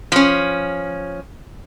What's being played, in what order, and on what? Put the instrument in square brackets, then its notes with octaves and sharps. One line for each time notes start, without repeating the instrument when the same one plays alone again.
[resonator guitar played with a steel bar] F3 C#4